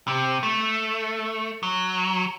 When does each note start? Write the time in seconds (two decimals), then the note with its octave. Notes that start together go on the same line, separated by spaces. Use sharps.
0.08 C3
0.43 A3
1.63 F#3